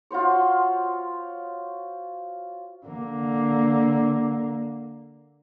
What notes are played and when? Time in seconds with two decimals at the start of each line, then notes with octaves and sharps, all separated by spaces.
0.11 F4 F#4 C5 C#5
2.86 D3 A#3